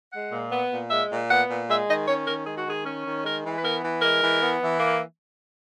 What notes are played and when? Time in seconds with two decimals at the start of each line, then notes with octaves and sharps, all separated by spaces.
0.12 G#3 F#5
0.32 A#2
0.51 B3
0.71 A#2
0.90 G#3 E5
1.10 A#2
1.29 B3 F#5
1.49 A#2
1.69 G#3 E5
1.88 D#3 D#5
2.07 C#4 C#5
2.27 D#3 A#4
2.46 G#3 G#4
2.57 F#4
2.66 D#3 G#4
2.85 C#4
3.05 D#3
3.24 G#3 A#4
3.43 E3
3.58 B4
3.63 B3 A#4
3.83 E3
4.02 G#3 A#4
4.21 E3
4.40 B3
4.61 E3
4.80 A#3